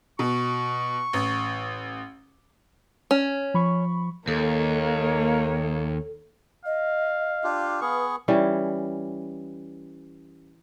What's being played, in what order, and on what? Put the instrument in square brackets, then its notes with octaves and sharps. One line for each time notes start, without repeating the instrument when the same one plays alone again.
[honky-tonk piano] B2 [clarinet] C#6
[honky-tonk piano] A1
[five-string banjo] C#4
[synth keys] F3 B5 C#6
[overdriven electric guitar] D#2 [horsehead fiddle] A#3 C#5 [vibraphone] A4
[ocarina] D#5 [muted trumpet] F5
[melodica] D4 F4 G4
[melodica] B3 G#4 C#6 [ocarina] B4
[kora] E3 G3 C#4